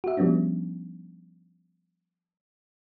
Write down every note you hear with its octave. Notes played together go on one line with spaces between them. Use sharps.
F#4 E5
F3 G3 B3 C#4 D4